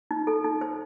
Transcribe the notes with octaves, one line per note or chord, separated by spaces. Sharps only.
D#4
A4
D#4
C5